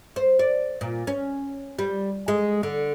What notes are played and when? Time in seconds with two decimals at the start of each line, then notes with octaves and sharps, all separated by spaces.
0.16 C5
0.39 D5
0.81 A#2
1.07 C#4
1.79 G3
2.28 G#3
2.63 D3